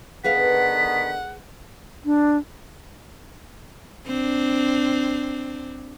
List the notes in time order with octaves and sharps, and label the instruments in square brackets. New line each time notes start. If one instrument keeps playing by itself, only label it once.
[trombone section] D3 D#3 B3 [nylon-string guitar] G#4 B4 F5 [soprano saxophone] F#5 [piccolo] B6
[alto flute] D4
[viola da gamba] C4 D4